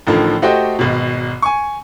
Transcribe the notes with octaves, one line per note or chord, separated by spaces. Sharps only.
A1 A2 D3 D#3 F3
A3 F#4 G4 C5 D#5 G5
G#1 B2
G#5 C#6